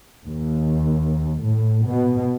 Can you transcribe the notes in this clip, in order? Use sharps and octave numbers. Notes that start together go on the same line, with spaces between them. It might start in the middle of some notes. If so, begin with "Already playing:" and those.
D#2
A2
B2